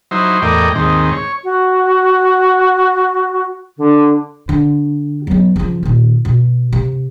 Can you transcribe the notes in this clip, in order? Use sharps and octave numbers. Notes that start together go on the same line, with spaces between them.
F#3 D#4 E4 C5
E2 A2 A#4 D5 D#5 G5
D#2 G#2 D#3 C4
C#5
F#4
D3
D3
F#3 B3
C#3 F3
A#2 D#3
B2
C3